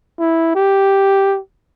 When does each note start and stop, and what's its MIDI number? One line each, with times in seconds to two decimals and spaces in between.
0.19 0.52 64
0.55 1.39 67